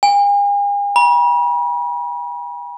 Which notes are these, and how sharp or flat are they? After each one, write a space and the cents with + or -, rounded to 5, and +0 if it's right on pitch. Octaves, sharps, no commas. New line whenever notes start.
G#5 -45
B5 -40